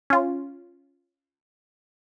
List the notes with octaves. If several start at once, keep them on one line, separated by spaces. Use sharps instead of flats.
C#4 F4